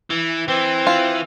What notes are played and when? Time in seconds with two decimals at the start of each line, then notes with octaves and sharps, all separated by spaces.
0.10 E3
0.48 E3 C4
0.87 F4